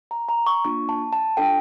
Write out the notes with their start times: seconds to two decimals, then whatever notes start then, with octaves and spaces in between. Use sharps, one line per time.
0.11 A#5
0.29 A#5
0.46 C#6
0.65 A#3 D4 F4 C#6
0.89 A5
1.13 A5
1.37 D4 F4 A4 G5